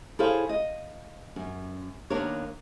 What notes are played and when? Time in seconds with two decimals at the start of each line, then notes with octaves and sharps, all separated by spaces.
0.19 E4 G#4 A4 C5 C#5 F5
0.49 D#5
1.36 F#2
2.10 D#2 A#3 B3 D4 A#4 C#5